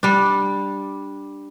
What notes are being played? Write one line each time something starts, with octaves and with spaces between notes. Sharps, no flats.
G3 D4